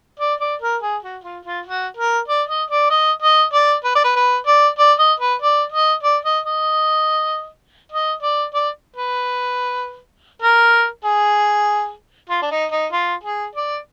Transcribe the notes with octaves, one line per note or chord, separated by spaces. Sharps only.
D5
D5
A#4
G#4
F#4
F4
F4
F#4
A#4
D5
D#5
D5
D#5
D#5
D5
B4
D5
B4
B4
D5
D5
D#5
B4
D5
D#5
D5
D#5
D#5
D#5
D5
D5
B4
A#4
G#4
F4
D4
D#4
D#4
F4
G#4
D5